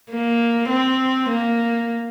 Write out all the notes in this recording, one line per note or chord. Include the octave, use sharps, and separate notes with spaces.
A#3
C4
A#3